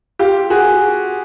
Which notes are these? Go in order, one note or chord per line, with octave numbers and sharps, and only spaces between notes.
F4 G4
F#4 G#4